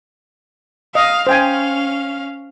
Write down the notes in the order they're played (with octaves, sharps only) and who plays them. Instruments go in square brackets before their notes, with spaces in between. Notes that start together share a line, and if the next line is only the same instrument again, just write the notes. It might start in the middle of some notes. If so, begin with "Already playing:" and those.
[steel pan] D#5 [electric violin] F5
[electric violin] C#4 F5 [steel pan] C5 G5 G#5